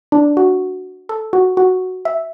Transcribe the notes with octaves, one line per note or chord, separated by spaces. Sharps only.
D4
F#4
A4
F#4
F#4
E5